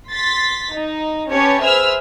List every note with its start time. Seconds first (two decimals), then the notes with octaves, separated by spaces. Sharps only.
0.11 C6 A6 B6
0.72 D#4
1.31 C#4 G4 B4 C#5 A5
1.61 G#4 B4 C5 E5 E6 F6